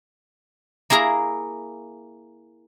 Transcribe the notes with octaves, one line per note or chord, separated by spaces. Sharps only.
A#3 E4 G#4 A#4 A#5